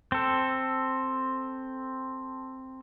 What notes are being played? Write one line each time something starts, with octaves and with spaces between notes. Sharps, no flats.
C4 A4